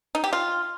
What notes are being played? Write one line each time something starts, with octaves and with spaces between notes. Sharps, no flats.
D#4
G4
F4